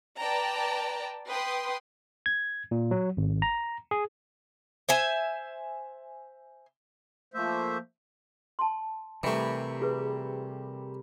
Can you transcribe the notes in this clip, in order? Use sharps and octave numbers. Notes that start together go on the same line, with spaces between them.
B4 D5 G5 A5 A#5
B4 G5 C6 D#6
G#6
A#2
F#3
G#1
A#5
G#4
C5 E5 G#5
F3 A3 A#3 C5 E5
A5 C6
C3 E3 G3 A3 A#4
F4 G#4 B4